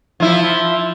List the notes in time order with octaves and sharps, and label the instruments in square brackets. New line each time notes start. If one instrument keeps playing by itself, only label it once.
[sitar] F3 E4